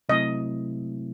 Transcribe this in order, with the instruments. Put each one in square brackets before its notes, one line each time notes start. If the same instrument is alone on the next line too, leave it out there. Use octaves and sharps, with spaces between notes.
[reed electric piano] C3 F#3 A3 C4 E4 [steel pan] D#5